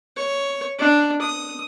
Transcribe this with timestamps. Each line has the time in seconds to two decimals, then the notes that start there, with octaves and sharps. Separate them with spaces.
0.16 C#5
0.79 D4
1.22 D#6